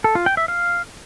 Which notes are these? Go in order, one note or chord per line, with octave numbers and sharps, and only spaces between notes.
A4
F4
G5
E5
F5